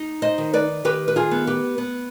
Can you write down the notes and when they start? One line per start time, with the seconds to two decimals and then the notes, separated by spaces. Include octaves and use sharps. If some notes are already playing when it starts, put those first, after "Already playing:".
Already playing: D#4
0.22 C5 D#5
0.38 D#3
0.53 B4 D5
0.85 D#3 G4 B4
1.08 B4
1.16 F4 G#4
1.31 B3
1.47 G4 B4
1.78 B3